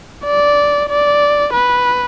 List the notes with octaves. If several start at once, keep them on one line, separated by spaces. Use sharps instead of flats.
D5
D5
B4